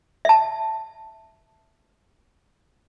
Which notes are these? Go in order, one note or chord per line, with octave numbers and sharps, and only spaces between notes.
E5 A5